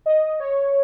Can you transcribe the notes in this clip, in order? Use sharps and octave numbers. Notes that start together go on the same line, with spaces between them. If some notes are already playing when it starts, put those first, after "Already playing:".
D#5
C#5